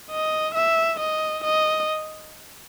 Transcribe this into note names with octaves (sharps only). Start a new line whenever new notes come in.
D#5
E5
D#5
D#5